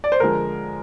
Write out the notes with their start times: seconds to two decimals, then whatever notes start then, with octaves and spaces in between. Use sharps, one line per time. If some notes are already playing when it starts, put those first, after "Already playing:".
0.04 D5
0.12 C5
0.20 D3 F3 G#3 A#4